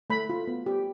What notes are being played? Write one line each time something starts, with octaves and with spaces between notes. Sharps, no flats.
A3 B5
F4
B3
G4